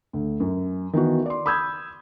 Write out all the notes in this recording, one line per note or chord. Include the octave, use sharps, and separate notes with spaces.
D2
F#2
D#3 E3 B3 F#4
D5 C6
B5 D#6 E6 G6 G#6